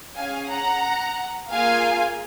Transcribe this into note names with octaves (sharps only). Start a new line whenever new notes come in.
C#4 G#4 F5 G#5
F#5 A#5
A#3 F4 G#4 F5 G#5